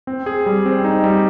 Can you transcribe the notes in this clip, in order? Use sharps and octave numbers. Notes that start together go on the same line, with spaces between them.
C4
G#4
G3
C4
D#4
G3